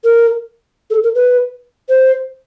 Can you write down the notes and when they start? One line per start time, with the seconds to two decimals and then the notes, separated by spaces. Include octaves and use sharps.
0.04 A#4
0.90 A4
1.04 A#4
1.15 B4
1.89 C5